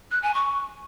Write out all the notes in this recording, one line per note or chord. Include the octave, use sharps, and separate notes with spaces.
F#6
G#5
C#6